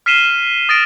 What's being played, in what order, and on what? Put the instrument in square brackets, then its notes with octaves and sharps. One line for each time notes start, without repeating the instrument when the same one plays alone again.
[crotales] F6 B6 C7 D#7 E7 G7
D#6 A6 A#6 D7 E7